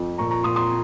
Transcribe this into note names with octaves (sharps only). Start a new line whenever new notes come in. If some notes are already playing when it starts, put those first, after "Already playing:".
Already playing: F2
A#2 A#5 C#6
A#5 C#6
A#2 C6 D#6
C6 D#6